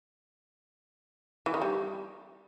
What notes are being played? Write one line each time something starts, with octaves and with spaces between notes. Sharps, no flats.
E3
D#3
G3